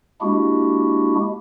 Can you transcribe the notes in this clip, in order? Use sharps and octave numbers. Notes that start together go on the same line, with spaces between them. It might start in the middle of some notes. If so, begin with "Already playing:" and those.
G#3 A#3 D4 E4 F#4 G4